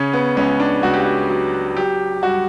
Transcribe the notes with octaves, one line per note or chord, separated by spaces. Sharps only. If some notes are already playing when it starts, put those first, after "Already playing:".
Already playing: C#3 C#4
B3
C#2 C#4
D4
C#2 F#4
G4
F#4
F#3
F#3 G4
G2 F#4